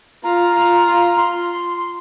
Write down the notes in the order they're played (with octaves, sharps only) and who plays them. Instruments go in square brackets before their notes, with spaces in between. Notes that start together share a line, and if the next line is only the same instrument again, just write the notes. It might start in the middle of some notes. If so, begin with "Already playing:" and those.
[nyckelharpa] F4 [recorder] A#5
[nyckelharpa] F4
F4
[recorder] C6